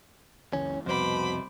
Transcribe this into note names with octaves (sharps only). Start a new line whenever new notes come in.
F#1 C#2 E3 C#4
C2 F2 B2 C5 B5 D6